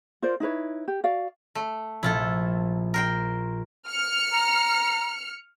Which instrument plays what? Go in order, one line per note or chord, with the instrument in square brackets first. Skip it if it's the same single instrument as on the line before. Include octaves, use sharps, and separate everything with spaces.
[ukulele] F4 A#4 C5 D5
D#4 E4 B4 C#5
G4
F#4 D5 F5
[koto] A3
[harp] A#1 [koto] E4 F4 A4
[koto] A#4 C5 G5
[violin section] F6 C#7
[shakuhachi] A#5